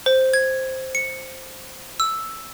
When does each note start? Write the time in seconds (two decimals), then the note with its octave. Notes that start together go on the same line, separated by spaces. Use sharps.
0.06 C5
0.34 G#6
0.95 C#7
2.00 E6